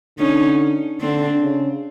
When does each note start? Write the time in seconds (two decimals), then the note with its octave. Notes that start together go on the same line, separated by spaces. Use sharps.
0.19 D3 C#4 D#4
1.01 D3 C4 D4
1.42 C#3